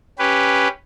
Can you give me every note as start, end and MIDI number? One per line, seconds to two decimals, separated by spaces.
0.19 0.68 61
0.19 0.68 67
0.19 0.68 71